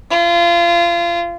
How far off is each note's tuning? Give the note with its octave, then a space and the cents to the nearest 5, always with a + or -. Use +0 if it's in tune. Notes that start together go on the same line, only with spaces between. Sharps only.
F4 -25